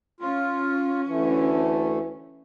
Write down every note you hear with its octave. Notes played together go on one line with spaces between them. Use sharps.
C#4 F4
D2 E3 A3